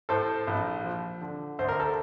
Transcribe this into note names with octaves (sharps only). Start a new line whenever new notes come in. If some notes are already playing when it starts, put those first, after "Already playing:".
A2 A4 C5
A#1
F3
D3
D2 C5
A#4
A4